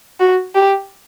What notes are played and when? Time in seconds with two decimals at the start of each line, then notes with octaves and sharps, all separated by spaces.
0.20 F#4
0.55 G4